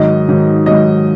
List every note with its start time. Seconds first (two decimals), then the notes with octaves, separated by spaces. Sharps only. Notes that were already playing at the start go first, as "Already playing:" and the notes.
Already playing: G#2 D#3 F#3 D#5
0.29 G#2 D#3 F#3
0.66 G#2 D#3 F#3 D#5